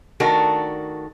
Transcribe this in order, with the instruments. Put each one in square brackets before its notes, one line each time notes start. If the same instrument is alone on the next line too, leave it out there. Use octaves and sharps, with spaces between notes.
[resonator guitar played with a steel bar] D#3 A3 D4 F#4 A4 A#4